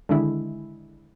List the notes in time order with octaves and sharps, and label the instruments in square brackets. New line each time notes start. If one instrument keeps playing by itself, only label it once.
[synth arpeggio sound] D3 D#3 G#3 D4 E4